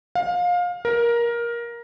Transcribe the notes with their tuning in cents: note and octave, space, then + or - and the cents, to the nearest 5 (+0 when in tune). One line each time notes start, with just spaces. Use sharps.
F5 +25
A#4 +15